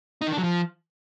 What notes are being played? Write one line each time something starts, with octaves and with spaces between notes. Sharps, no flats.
D#4
D#3
D4
F#3
F3